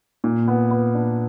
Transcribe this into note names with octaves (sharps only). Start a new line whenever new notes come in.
A#2
B3
B3
D4